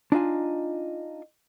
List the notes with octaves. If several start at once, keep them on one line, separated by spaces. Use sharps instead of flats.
D4 D#4 F4 G#5